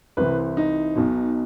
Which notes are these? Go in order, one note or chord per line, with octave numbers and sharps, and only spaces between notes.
C2 C3 E3 B4
D#4
B1 B2